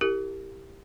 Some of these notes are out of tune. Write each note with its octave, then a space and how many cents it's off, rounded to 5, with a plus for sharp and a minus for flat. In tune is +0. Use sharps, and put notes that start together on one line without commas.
E4 +0 G4 +0 A#4 -30